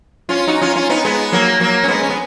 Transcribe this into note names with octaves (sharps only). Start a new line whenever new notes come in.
C#4 F4
D#4 F#4
C#4 F4
C#4 F4
B3 D#4
G#3 B3
F#3 A#3
F#3 A#3
C#4
G#3 B3
C#4
B3